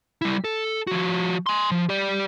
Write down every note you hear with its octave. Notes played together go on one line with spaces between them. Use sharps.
G3 E4
A4
F3 F#4
G#5 C6
F3
G4 D5